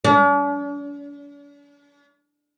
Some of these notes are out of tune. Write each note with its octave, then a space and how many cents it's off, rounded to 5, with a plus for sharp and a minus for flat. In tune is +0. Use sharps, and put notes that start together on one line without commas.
D4 -45